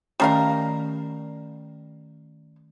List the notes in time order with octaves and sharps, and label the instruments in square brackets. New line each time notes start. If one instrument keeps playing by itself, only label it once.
[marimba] D#3 A3 C#4 [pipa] G3 A#4 F5